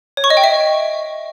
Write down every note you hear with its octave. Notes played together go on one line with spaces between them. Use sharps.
C#5
C#6
D#5
G5
E5